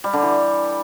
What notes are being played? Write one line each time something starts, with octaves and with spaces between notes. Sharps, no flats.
G3
D3
E3